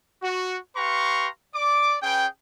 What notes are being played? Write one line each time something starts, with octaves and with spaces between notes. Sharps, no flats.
F#4
G4 B4 F5 A#5 C6 C#6
D5 D6
C#4 G#4 B4 G5